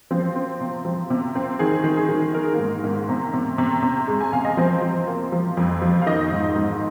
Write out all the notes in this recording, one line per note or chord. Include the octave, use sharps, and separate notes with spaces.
F3 C4 C5
C4
C3
F3
C3
C4
D#3 G#4
D#3
G#4
D#3
D#3 A#4
G#4
G#2 A#3 A#4
G#2
C3
C3
C3
C3
G#3
G#5
C3 F5
D#5
F3 C4 C5
F3
A#3
F3
F2
F3
F5
D#3 D#4 D#5
G#2
G#2